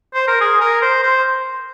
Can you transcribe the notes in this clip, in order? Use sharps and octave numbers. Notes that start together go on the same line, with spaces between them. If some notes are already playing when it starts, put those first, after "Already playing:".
C5
A#4
G#4
A#4
C5
C5